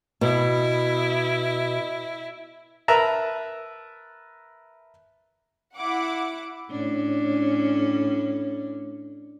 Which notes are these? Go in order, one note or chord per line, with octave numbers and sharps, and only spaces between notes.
B2 E4
A#4 B4 E5 A5 A#5
E4 F#5 D6
A2 C#4 D4